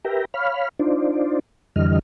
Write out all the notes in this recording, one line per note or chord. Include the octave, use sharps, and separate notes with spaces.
G4 A#4 B4 E5 G5 A#5
C#5 F5 B5 F6
D4 D#4 F4 C5 D5
F2 D3 E3 G3 D#5 F6